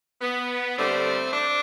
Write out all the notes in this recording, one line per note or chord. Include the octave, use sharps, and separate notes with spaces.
B3
G2 D3 G3 A3 C4
D4